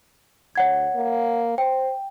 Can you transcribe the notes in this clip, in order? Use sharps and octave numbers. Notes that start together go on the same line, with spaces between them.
D2 C#5 F#5 G#6
A#3
C5 G5